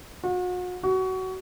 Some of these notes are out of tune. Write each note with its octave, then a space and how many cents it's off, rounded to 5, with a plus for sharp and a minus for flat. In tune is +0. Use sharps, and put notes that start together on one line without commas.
F#4 -40
F#4 +20